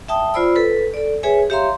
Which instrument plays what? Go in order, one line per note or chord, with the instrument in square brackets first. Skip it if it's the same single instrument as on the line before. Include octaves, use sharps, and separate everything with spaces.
[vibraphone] E5 G5 A5 D#6
F4 C5 D5 B5 E6
A4 B4
A4 D5
G#4 B4 C#5 E5 G#5
G4 C#5 E5 F5 A#5 C6